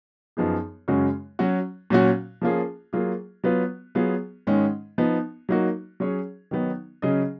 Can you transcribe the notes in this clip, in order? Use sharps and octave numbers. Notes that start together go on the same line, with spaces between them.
F#2 F3 B3 D#4 G#4
F#2 C#3 G#3 C#4 F#4
F#3 C#4 F#4
A#2 F#3 C#4 F#4
F3 A#3 C#4 F4 G#4
F#3 A#3 F4 G#4
F#3 B3 F4 B4
F#3 B3 F4 G#4
G#2 D#3 G#3 C#4
F3 B3 D#4
F#3 A#3 D#4 F#4
F#3 C#4 G#4 C#5
D#3 F#3 B3 D#4
C#3 F#3 C#4 G#4 D#5